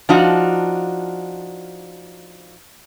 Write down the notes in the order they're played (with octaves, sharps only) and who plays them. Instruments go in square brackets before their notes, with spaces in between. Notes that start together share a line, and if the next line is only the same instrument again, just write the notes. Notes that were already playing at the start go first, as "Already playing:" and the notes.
[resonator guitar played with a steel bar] F3 D4 D#4 F4 F#4